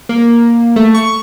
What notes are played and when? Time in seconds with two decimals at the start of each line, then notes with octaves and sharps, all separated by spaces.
0.09 A#3
0.76 A3
0.95 C#6